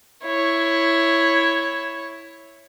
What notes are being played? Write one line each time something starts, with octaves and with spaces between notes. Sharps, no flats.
E4 C#5